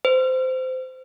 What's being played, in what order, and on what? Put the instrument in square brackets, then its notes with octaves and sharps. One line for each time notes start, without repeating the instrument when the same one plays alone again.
[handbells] C5